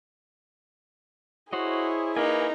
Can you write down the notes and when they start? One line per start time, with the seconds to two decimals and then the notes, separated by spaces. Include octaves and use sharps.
1.53 E4 F#4 G#4 C5 C#5 D#5
2.16 A#3 D#4 B4 G#5